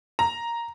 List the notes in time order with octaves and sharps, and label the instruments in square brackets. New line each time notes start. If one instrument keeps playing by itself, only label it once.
[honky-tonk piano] A#5